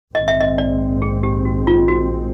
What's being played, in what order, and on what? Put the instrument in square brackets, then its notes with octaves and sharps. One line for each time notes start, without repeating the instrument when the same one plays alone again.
[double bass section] A#1 G#2 D#3 G#3 C4 [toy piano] D#5
[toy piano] E5
D#5
D5
G#4
G4
F#4
F4
F#4